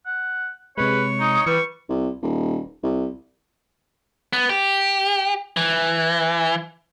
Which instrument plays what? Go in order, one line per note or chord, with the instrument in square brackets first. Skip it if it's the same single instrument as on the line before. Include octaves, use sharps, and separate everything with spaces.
[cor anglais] F#5
[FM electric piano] C3 G#3 [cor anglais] B4 [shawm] C#5
[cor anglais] D#4 [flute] D#6
[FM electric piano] E3 [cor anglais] G3 [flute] B4 [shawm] C#6
[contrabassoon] C2
D#1
C2
[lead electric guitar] B3
G4
E3